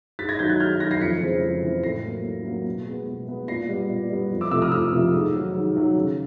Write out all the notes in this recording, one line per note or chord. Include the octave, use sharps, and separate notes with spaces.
G#2 A6 B6
G#6 A#6
D#3 F#3 G6 A6
F#6 G#6
G#2 F6 G6
D#3 F#3 G#6 A#6
A#6 C7
F2 B6 C#7
C#3 E3 G#3 C4
F2
C#3 E3 G#3 C4
A2 A#6 C7
F#3 A#3
A2
F#3 A#3
B2
G#3 B3
B2
G#3 B3
A#2 A#6 C7
G3 B3
A#2
G3 B3
F2
D6 E6
C3 F3 A3 D6 E6
D#6 F6
F2 D6 E6
C3 F3 A3
G#2
D#3 F#3
G#2
D#3 F#3
C#3